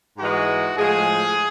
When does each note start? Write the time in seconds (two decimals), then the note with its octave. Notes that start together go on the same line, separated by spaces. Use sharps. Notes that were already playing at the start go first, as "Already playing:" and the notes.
0.17 G#2 E3 G#3 F#4
0.76 A2 F3 G#3 G#4